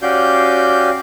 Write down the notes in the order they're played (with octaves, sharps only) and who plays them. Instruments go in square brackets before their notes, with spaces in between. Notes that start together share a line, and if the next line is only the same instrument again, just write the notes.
[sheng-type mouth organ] C#4 F#4 G4 D5 F5 G6